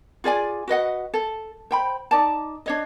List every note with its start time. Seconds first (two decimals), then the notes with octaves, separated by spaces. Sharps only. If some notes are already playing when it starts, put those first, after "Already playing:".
0.24 F4 G#4 D5 G#5
0.68 F#4 B4 D#5 F#5
1.14 A4
1.71 C5 G5 B5
2.11 D#4 D5 A5
2.66 D4 C#5 D#5